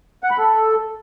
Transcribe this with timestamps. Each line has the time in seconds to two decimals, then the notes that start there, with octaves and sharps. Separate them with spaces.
0.23 F#5
0.31 B5
0.38 A4